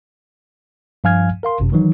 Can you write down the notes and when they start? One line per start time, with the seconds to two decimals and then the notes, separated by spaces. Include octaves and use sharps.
1.04 G2 F3 F5 G#5 F6 G#6
1.43 A#4 F5 C6
1.60 G#1 F#2 C3
1.72 D#3 E3 F#3 D#4